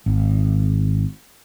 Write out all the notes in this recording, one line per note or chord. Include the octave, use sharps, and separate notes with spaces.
G#1